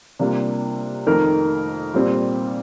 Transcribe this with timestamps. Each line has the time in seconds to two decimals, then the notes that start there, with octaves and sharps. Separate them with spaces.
0.19 C3 G3 A#3 D4 F4
1.07 F2 D#3 A3 D#4 A#4
1.94 A#2 G3 C4